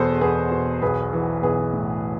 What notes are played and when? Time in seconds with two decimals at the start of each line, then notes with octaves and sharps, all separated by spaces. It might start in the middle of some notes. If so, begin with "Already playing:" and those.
Already playing: E2 B2 G#4 A4 B4 C5
0.21 E2 G#4 B4
0.51 B2
0.82 B1 G#4 B4
1.13 E3
1.42 B1 G#4 B4
1.73 A2